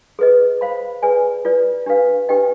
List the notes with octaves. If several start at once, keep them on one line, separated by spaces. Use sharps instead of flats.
G#4 B4 D#5
C5 F5 B5
G#4 B4 D5 G#5
F4 B4 D5
D4 G4 B4 F5
D4 G4 B4 D#5 G5